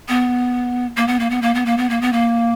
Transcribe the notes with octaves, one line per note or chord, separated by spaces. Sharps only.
B3
A#3
B3
A#3
B3
A#3
B3
A#3
B3
A#3
B3
A#3